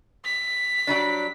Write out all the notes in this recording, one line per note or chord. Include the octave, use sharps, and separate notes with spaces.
B6
F#3 G3 D4